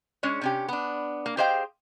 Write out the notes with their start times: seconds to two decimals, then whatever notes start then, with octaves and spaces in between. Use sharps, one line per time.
0.23 G#3 C#4 D4 C#5
0.41 C3 C#4 G4
0.68 B3 D4
1.26 A#3
1.37 G4 G#4 C5 D#5 F5 G5